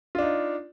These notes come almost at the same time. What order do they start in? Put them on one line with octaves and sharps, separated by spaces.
F4 D4 D#4